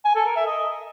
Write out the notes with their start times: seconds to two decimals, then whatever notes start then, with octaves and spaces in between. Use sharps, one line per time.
0.05 G#5
0.15 A4
0.26 A#4
0.36 E5
0.46 D#5